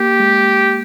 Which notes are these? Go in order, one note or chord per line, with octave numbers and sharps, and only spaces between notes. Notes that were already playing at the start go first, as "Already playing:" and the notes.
Already playing: A#3 G4
G#3